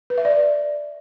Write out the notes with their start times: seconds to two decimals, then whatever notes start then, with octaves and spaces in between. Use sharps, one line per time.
0.10 B4
0.18 E5
0.25 D5